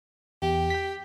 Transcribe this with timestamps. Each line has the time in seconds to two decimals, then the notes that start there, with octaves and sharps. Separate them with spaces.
0.42 E2 G4
0.70 G5 B6